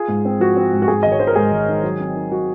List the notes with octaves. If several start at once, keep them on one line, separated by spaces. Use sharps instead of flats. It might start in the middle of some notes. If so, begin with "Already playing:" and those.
Already playing: F4 G#4
G#2
C4
F3 F#4
C4
G#2
F#4
G#2 G#4
G#1 D#5
C#5
D#3 C5
A#4
G#2 G#4
G#1
D#3
F#3
C4
D#4
F#3 F#4